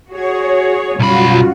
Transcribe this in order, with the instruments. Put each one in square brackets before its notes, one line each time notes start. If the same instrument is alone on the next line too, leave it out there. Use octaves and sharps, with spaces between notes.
[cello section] F#4 G#4 [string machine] C#5
[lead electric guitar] B1 B5 [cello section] F#2 C#3 G3 [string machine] F4 F#4